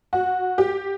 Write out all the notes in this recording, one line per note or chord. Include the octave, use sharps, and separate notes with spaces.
F#4
G4